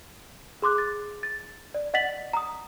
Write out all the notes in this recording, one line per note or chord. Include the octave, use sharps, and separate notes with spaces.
G#4 C6 D6 F#6
A6
A6
D5
D#5 F#5 A6 B6 F#7
A#5 D#6